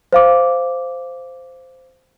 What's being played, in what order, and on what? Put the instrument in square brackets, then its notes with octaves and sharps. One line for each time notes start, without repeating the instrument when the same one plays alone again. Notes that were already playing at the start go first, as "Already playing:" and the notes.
[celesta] C5 F5 D6